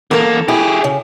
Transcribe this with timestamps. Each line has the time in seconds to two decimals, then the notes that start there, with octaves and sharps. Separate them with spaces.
0.11 E2 A#3 A4 A#4
0.48 E4 G4 G#4
0.84 C#3